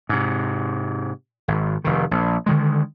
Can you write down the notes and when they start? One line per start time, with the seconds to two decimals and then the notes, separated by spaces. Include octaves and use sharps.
0.09 G#2 C3
1.48 G#1
1.84 F1 D#3
2.11 A#1
2.46 D3 D#3 G#3